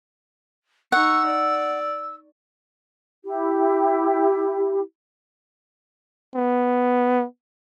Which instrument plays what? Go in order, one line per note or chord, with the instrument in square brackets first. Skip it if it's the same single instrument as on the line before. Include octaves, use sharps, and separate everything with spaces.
[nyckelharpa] D#4 C#6 [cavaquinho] F#5 [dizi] E6
[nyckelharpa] D5
[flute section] E4 G4
[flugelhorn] B3